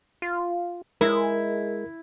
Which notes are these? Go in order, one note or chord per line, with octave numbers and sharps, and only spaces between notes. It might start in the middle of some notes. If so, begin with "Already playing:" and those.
F4
G#3 E4 A#4